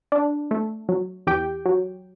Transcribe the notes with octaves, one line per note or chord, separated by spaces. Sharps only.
D4
A3
F#3
E2 G4 G5
F#3